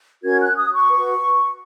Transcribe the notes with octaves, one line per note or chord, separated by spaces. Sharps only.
C#4 F#4 A#4 G#6
F#6
D#6
C#6
F#4 B4